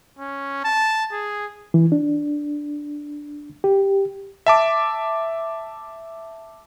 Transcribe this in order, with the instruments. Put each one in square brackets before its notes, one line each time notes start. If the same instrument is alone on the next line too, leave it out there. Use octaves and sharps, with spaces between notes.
[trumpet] C#4
A5
G#4
[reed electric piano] E3
D4
G4
[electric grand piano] E5 A5 D6